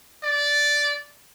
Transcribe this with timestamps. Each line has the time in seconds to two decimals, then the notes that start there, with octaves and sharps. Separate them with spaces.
0.23 D5